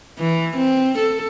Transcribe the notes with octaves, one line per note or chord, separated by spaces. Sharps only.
E3
C4
A4